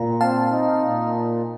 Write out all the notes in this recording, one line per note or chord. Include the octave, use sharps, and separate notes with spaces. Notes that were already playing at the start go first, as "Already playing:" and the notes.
Already playing: A#2 A#5
C4 F5 A5
D#4
A#2